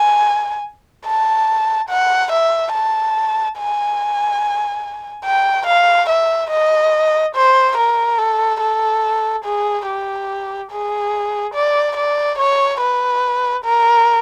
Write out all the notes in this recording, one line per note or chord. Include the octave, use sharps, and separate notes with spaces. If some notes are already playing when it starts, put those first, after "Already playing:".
Already playing: G#5
A5
F#5
E5
A5
G#5
G5
F5
E5
D#5
C5
A#4
A4
A4
G#4
G4
G#4
D5
D5
C#5
B4
A#4